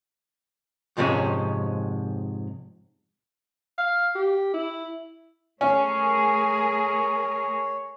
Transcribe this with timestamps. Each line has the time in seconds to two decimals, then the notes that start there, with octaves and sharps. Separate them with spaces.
0.97 F2 G#2 C3 G#3 C#4
3.78 F5
4.15 G4
4.53 E4
5.61 A3 C#4 G#4 A#4 C#5